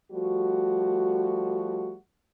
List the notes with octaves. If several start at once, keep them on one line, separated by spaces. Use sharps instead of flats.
F3 G3 A3 F#4